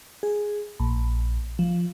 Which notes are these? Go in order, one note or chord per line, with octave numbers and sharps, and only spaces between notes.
G#4
A#1
F3